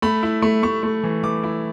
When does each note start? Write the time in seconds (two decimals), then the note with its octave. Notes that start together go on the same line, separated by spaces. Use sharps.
0.02 A3 B5
0.23 E4
0.42 A3
0.63 A3 C#6
0.83 A3
1.04 E3
1.23 E3 D6
1.43 E4